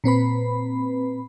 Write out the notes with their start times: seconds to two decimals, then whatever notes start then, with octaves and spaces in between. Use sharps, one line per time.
0.04 A#2 C4 B4 B5